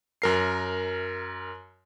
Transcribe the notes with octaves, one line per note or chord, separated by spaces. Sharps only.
F#2 A#4 C7